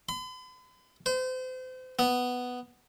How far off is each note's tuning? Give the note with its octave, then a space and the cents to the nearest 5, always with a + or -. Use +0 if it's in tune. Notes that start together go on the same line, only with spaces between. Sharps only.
B5 +45
C5 -35
B3 +5